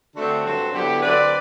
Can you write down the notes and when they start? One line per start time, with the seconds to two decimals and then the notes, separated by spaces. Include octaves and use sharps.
0.15 D3 A3 C4 F#4 A4
0.44 G2 F#3 C4
0.73 D3 F#3 B3 E4 G4
1.02 D3 F#3 C4 B4 D5